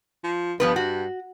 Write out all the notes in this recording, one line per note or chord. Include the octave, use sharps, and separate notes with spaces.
F3
G2 F3 B3 B4
F#4